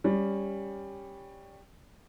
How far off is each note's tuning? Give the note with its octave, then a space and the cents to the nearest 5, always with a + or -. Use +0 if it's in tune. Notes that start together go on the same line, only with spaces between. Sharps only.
G3 +10 C#4 +0